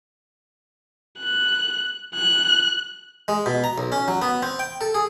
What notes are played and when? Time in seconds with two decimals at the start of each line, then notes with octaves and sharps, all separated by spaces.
1.19 F#6
2.14 F#6
3.28 G#3
3.46 B2
3.64 A#5
3.78 B1
3.92 C#4
4.08 F#3
4.22 B3
4.42 C4
4.59 G5
4.81 A4
4.94 G#4